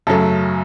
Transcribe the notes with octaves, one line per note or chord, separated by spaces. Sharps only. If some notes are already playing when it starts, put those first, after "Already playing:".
F#2 C#3 F#3 A3 A4